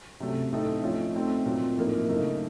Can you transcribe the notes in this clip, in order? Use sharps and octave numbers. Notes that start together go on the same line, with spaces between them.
C3 F#3 A3 C#4
A2 A3 C4 D#4 A4
F3 A3 C#4 F4
A3 C4 D#4
A#2 F#3 C4
A2 F3 A#3 D#4 A#4
F#2 C#3 A3 D#4